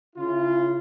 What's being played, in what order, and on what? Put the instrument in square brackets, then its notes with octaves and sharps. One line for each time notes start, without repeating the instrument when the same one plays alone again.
[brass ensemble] C#3 E4 F4